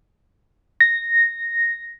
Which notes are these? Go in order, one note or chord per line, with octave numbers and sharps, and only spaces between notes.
A#6